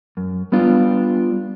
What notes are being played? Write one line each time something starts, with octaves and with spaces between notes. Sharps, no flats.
F#2
G3 B3 D4 F4